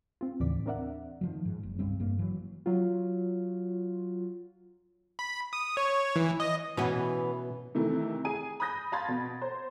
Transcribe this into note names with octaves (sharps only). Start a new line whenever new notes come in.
C4 F4
D#2 A2 C#3 E3 D5 B6
C4 D4 A#4 D5 E5 F#5
D#3 F3 F#3
G#2
F#1
C2 G2 G3 C4
G#1 G2 A#3
E3 F#3
F#3 F4
B5
D#6
C#5
E3
D#5
B2 E3 B3 C#4
C3 D#3 E3 A3 E4
G#4 G#5 D#7
B5 D#6 G6 A#6
F5 A5 B5 C6 G#6 A6
B2
C5